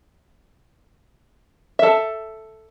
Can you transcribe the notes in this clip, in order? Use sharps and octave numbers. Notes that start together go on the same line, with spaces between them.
A4 E5